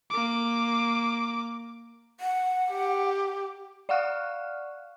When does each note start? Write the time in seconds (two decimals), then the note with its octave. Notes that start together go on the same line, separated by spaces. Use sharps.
0.10 A#3 D6
2.20 F#5
2.71 G4
3.89 D5 F5 F#5 C#6 F6 F#6